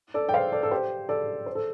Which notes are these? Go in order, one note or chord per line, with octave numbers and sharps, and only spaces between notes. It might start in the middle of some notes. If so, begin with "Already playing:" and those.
A4 D5
G5
C5 F5
A4 D5
A4
G4 C5
A4 D5
C5
A4